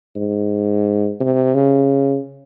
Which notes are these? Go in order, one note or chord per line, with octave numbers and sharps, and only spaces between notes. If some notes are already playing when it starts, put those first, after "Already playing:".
G#2
C3
C#3